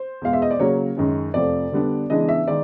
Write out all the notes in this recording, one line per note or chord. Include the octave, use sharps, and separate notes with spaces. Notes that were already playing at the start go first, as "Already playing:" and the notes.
Already playing: C5
E2 B2 G#3 F5
E5
D#5
D5
C#3 F#3 A#3 C#5
F#2 D#3 G#3
F2 C3 F3 A3 D5
D3 G3 B3 D4
C#3 E3 G#3 B3 D4 D#5
E5
D#3 G#3 D5